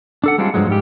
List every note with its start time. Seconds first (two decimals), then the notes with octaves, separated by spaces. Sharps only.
0.24 D4 A4 F#5
0.38 G3 G#3 C4 D4 F4
0.54 G2 F3 F#3 G#3
0.68 G#2 G3 G4